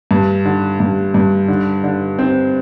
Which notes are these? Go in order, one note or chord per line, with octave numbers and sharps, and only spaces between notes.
G2
D3
G2
G2
D3
D3
C4